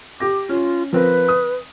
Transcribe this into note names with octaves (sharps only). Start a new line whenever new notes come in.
G4 D6 A#6
C#4 F4
F3 C4 A#4 B4
D#6